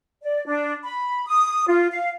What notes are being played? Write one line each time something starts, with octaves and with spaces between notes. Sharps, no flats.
D5
D4
B5
D#6
F4
F5